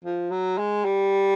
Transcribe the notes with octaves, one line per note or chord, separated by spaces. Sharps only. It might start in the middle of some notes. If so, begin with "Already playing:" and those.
F3
F#3
G#3
G3